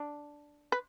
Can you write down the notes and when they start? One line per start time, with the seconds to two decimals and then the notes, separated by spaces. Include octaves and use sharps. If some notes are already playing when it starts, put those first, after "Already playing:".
Already playing: D4
0.72 B4